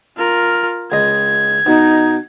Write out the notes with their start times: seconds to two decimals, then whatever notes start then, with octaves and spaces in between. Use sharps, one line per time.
0.17 F4 A#4
0.92 C#2 D#5 G#6
1.66 B2 D#4